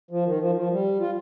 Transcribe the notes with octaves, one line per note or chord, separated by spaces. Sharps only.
F3
D#3
F3
F3
G3
F4